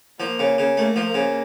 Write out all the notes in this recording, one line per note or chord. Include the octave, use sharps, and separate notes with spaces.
F3 A#3
C#3
C#3
A3 A#3
F3
A#3
C#3